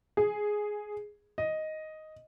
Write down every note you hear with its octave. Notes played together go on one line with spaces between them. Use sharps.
G#4
D#5